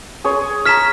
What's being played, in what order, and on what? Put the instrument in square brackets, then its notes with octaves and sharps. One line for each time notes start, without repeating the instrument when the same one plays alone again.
[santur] G#4 C#5 C6
[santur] A#5 C#6 [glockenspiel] F6 B6 E7